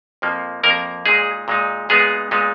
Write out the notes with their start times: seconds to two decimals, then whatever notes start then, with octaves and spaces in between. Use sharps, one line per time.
0.22 F2 F3 A#3
0.63 F2 F3 A#3 A#4
1.06 A#2 G#3 D#4 G#4
1.48 A#2 G#3 D#4
1.89 A#2 G#3 B3 D#4 G#4
2.31 A#2 G#3 B3 D#4